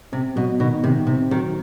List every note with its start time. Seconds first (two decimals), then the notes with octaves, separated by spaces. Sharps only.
0.12 C3 C4
0.36 B2 F#3
0.60 B2 D#3
0.83 C3 D#3
1.07 C3 C4
1.31 D#3 F#3